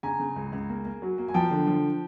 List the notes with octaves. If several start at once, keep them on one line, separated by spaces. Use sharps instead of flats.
C#3 G#5 A#5
C#3
C#2
C#2
A#3
A#3
F#3
A#3
G#5
F3 G5 A5
D3
F3